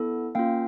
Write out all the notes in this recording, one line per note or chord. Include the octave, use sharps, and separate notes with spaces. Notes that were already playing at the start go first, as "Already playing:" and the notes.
Already playing: B3 E4 A4
A#3 C#4 F4 F5 G5